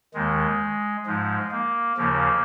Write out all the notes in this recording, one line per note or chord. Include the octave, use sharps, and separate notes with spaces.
D#2 D#3 G#3
G#2 F3 G#3
A#3
D#2 C#3 F3 A#3